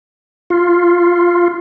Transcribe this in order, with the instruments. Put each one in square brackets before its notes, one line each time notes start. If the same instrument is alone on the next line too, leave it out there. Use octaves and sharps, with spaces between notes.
[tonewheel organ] F4